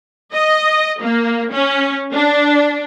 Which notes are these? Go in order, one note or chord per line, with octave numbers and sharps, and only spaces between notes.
D#5
A#3
C#4
D4